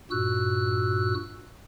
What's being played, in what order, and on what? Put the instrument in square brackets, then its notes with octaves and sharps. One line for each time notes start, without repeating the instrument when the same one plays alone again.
[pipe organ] G2 A#2 F#4 E6 F#6